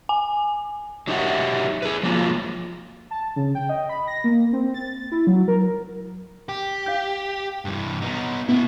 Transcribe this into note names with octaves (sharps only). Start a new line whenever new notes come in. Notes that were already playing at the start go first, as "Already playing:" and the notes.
G#5
F#3 D#4 G4 E5 F#5
G#4 B4
F3 F#3 G#3 A#3 F4
A5
C#3
G5
D#5
B5
A#6
A#3
C4
A6
E4
F#3
A#4
G4
F5 G6
G2 E3
B3 D#4
B2 B3 E4